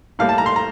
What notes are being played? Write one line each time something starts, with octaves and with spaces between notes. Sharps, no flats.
A2 G3 A#3 F5
A5
A#5
C6
A#5